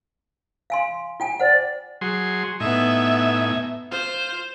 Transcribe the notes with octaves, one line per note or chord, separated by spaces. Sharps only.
F5 G#5 C6
F4 G5 G#5
C5 D5 F#5
F#3 G#4 C6
A2 B3 D#4 E5 G#5
F4 C5